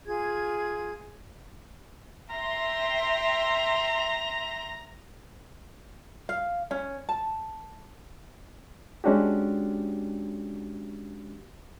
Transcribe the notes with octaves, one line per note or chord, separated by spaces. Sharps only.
F4 G#4 G#6
E5 G5 A#5 C6
F5
C#4
A5
G#3 C#4 D4 F#4 G4